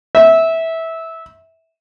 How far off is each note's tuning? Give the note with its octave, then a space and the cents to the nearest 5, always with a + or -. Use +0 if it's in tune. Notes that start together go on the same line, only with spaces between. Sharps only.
E5 -15